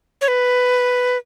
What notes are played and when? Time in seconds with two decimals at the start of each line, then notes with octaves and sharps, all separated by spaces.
0.21 C#5
0.28 B4